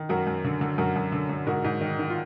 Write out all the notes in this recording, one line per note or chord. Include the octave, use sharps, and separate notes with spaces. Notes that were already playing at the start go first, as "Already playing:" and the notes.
Already playing: D#3
F#2 F#4 A#4
F#2
D3
D3
F#2 F#4 A#4
F#2
D3
D3
G#2 F#4 A#4
G#2
D#3
D#3
F4